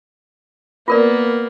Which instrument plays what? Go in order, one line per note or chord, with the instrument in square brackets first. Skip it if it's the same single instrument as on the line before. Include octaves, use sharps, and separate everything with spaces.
[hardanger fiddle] A#3 B3 [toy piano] F4 A#4 D5